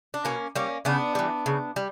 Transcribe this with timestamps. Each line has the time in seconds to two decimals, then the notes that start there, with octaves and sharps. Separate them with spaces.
0.14 D4
0.25 B2 A#3 C#4
0.55 G3 A#3 C#4
0.85 C#3 B3 D4
1.15 E3 G3
1.46 C#3
1.76 G3